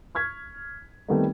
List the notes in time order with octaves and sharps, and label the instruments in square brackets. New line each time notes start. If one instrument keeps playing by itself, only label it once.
[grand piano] C#6 F6 G#6 B6
D#3 G3 A3 B3 C4 D#4